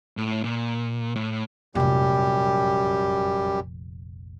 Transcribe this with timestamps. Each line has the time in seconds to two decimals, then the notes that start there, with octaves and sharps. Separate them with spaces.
0.17 A2
0.44 A#2
1.16 A2
1.75 F1 A#1 F#2 G3 G4